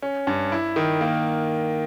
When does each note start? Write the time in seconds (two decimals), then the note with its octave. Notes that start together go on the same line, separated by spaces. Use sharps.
0.02 C#4
0.27 G2
0.52 E4
0.76 D#3
1.01 A#3